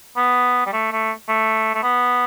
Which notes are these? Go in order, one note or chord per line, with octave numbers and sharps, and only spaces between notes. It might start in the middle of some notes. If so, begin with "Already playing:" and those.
B3
G3
A3
A3
A3
A3
B3